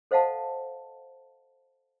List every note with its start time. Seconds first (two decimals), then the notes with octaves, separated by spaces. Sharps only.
0.11 A4 C5 D#5 F5 F#5 A5